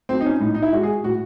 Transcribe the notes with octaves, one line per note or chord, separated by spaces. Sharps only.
F#3 A3 C4
D#4
C#4
A2 D#4
D#4
E4
G#3 F#4
G#4
A2 F#4